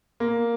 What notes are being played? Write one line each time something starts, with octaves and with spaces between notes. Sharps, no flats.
A#3